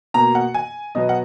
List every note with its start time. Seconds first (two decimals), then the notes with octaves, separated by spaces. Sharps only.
0.14 B2 A#3 A#5
0.35 F#5
0.54 G#5
0.95 B2 F#3 B3 D#5
1.09 F#5